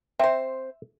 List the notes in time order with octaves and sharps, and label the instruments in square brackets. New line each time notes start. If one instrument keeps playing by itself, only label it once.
[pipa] C4 C5 [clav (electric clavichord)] E5